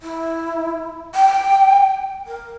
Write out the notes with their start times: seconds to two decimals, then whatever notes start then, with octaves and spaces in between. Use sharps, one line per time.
0.02 E4
1.15 G5
2.27 A#4